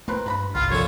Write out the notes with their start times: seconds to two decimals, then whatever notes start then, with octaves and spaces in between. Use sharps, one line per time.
0.08 A3 C4 A#4 B4
0.26 G2 B4 A#5 B5
0.55 G1 C2 F4 B5
0.71 A#1 D3 A4 C#5